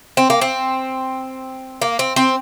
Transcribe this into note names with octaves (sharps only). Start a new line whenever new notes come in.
C4
A#3
C4
A#3
C4
C4